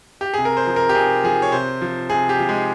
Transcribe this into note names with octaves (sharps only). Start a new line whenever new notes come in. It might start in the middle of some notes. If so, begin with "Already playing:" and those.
G4
C3 G#4
A#4
C5
F3
A#4
G4
C3 G#4
F3 G#4
C#5
C3 C5
F3
C3 G#4
G4
F3
G#3